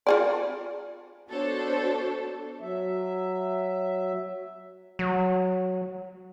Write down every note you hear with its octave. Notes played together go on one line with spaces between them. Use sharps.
F4 G#4 D5
B3 D4 F#4 A4 C5 C#5
F#3 E5
F#3